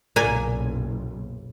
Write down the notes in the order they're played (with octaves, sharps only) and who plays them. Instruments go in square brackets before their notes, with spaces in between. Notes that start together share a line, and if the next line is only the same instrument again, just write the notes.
[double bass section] F#1 B1 [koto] A#2 A#3 G#5